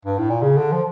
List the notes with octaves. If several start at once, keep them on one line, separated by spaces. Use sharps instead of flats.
G2
A2
A#2
C#3
D3
F3